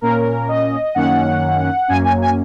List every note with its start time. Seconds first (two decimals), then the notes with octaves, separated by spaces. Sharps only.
0.01 A#2 A#3 C#4 A#4
0.48 D#5
0.95 F#2 D#3 A#3 C#4 F#5
1.88 F#2 F#3 A#3 C#4 G#5
2.04 G#5
2.22 G#5